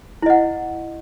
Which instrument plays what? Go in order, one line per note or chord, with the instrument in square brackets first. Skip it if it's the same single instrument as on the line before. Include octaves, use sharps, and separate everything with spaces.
[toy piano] E4
D#5
F#5